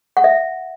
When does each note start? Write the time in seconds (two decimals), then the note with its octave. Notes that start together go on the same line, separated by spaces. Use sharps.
0.17 F#5
0.24 E5